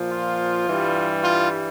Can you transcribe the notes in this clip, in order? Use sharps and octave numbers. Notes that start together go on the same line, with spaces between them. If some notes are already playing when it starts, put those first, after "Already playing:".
Already playing: A#2 F3
F4
G2 E3 G3
F4